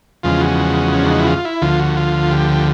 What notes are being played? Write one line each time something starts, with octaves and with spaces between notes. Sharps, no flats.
E2 C#3 F3 G#3 F4
F#4
C#4
D4
D#4
E4
F4
E4
D2 D3 F3 F4
F#4
F4
G4